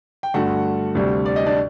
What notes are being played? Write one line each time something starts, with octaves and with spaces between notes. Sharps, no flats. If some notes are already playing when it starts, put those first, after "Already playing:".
G5
G2 D3 A3 F#4 F#5
D2 C3 G3
D5
D#5
D4 D5